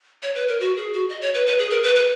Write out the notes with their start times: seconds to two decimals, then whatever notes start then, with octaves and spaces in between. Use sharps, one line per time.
0.23 C#5
0.35 B4
0.48 A#4
0.60 F#4
0.77 G#4
0.93 F#4
1.09 D#5
1.21 C#5
1.34 B4
1.46 B4
1.59 G#4
1.70 A#4
1.83 B4
1.96 B4